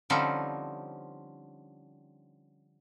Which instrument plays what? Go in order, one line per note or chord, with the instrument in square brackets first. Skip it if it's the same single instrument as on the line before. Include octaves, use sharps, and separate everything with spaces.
[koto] D3 F3 G3 C4 C#4 D#4